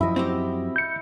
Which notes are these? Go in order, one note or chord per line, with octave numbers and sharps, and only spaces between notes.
F#2 F3 E4 D#5
C4 F#4 G4
G6 C#7